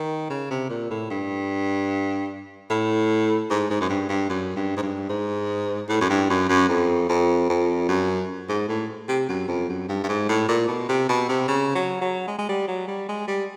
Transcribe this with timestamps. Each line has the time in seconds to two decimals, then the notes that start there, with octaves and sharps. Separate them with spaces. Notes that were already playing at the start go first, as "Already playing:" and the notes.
Already playing: D#3
0.30 C#3
0.51 C3
0.70 A#2
0.91 A2
1.10 G2
2.70 A2
3.50 G#2
3.70 G#2
3.81 F#2
3.89 G2
4.09 G2
4.29 F#2
4.56 G2
4.77 G#2
4.82 G2
5.09 G#2
5.89 A2
6.01 F#2
6.10 G2
6.30 F#2
6.49 F#2
6.69 F2
7.09 F2
7.50 F2
7.89 F#2
8.49 G#2
8.69 A2
9.08 C3
9.29 F#2
9.48 F2
9.69 F#2
9.89 G2
10.03 G2
10.09 G#2
10.29 A2
10.48 A#2
10.68 B2
10.89 C3
11.09 B2
11.29 C3
11.48 C#3
11.75 F#3
12.01 F#3
12.28 G#3
12.39 G#3
12.49 G3
12.68 F#3
12.88 G3
13.09 G#3
13.28 G3